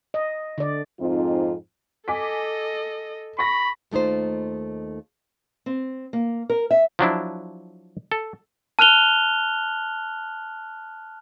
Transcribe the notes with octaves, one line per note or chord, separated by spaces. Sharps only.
D#5
D3 D5
F2 G#2 C4 D#4 F4
A4 D#5 G#5 D6 B6
B5 C#6 A#6
D#2 A3 D#4 F4 C5
C4
A#3
A#4
E5
F3 F#3 D4 E4
A4
A5 F6 F#6 F7 G7